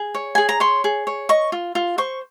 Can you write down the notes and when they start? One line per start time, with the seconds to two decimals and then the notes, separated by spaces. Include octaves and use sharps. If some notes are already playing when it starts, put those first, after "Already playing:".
Already playing: G#4
0.15 C#5
0.35 G#4 G#5
0.49 A#5
0.60 C#5 C6
0.84 G#4
1.07 C#5
1.29 D#5 C#6
1.52 F4
1.75 F4
1.98 C5 C#6